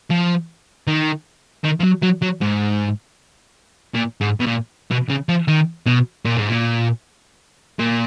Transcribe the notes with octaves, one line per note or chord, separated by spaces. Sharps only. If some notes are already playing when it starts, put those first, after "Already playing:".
F3
D#3
D#3
F3
F#3
F#3
F#3
G#2
A#2
G#2
B2
A#2
B2
C#3
F3
D#3
B2
A#2
G#2
A#2
A#2